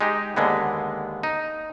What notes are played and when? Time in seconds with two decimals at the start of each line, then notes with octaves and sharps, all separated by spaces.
0.01 G#3 D#4 G4
0.36 D#2 D3 G#3 B3
1.23 D#4